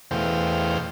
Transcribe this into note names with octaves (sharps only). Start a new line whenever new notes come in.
E2 B2 A3 C5 F5 G5